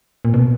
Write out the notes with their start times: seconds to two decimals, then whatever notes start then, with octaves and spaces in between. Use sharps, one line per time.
0.25 A#2
0.34 B2